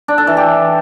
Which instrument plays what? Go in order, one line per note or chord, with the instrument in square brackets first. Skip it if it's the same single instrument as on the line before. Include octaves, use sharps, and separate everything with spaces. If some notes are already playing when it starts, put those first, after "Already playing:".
[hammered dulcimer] D4
A4
E3
G4